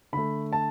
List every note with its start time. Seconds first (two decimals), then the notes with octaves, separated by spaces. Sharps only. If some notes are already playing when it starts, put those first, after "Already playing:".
0.13 D3 A3 B5
0.53 A5